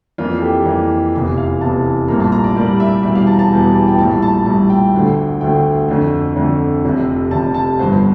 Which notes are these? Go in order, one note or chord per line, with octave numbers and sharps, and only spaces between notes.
F2 E3 A#3 F4
A4
G4
F2 E3 A#3
F1 E2 E3
F5
F1 E2 E3 A5
A#1 A2 G3 A#3 A#5
A5
A#5
D5
A#1 A2 G3 A#3 D5
E5
E1 E2 E3 G3 E5
F5
A5
A#5
A5
E1 E2 E3 G3
A5
G5
A#1 A2 G3 A5
A5
A#1 A2 G3 A5
G5
D2 D3 A3
D2 D3 A3 G5
F2 D3 A3
F2 D3 A3
F1 F2 C3
F1 F2 C3 A5
A5
G1 G2 F3 C5